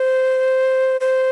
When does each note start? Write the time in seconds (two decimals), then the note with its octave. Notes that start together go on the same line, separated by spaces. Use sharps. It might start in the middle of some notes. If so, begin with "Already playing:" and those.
Already playing: C5
1.01 C5